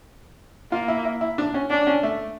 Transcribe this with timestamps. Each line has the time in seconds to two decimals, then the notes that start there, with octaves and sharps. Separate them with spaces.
0.72 A#3 F4
0.88 E4
1.05 E4
1.21 E4
1.38 D4
1.54 C#4
1.70 C#4 D4
1.87 C#4
2.03 A3